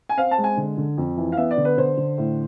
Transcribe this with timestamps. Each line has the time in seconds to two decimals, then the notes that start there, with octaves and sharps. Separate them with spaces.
0.09 G#5
0.18 C4 F5
0.31 A5
0.38 G#3
0.44 G#5
0.57 D3
0.77 D3
0.97 F2
1.17 E3
1.32 F5
1.37 B3 E5
1.51 D5
1.57 D3
1.65 B4
1.77 D3 C5
1.97 D3
2.18 A2